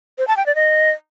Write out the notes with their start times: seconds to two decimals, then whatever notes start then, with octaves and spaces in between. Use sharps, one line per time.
0.18 C5
0.28 A5
0.37 G5
0.46 D5
0.55 D#5